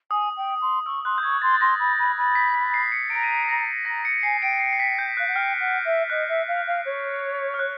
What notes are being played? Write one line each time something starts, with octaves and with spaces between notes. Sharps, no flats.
G#5 D#6
G5
C6
C#6 E6
C6 F#6
G6
C#6 G#6
C6 A6
A6
C6 A#6
B5
B5
B5
B6
B6
C7
C#7
A#5 D7
D#7
D7
A#6
A#5 A#6
C#7
G#5 C7
G5 D7
C7
C7
B6
G6
F5 F#6
F#5
G5 F6
F#5
E5
D#5 F#6
E5
F5
F5
C#5
F6
F#6